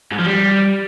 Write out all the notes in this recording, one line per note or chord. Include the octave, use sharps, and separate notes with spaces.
G#2
F3
G3